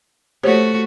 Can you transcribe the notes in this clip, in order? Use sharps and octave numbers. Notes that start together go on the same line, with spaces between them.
A3 F#4 G4 C5 C#5